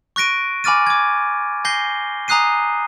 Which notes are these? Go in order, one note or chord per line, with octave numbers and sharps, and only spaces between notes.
C#6 F#6 A#6 D7 D#7
G#5 B5 D6 F6 A6 D#7
D6 G#6
G#5 G6 A#6 C7 G7
G#5 A#5 D#6 F#6 C7 D#7